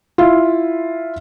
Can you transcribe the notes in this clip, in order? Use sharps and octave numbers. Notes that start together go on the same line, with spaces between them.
E4 F4